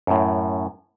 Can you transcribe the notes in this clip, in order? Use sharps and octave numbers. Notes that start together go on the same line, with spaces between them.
F#2 A2